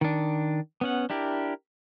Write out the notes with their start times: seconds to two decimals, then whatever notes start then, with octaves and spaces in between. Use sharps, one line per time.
0.01 D#3 D4
0.81 B3 C#4 F#5
1.10 D4 E4 G4 A#4